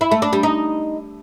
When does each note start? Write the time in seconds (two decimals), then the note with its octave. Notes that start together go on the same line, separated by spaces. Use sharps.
0.01 E4
0.11 A3
0.22 D4
0.33 G3
0.43 D#4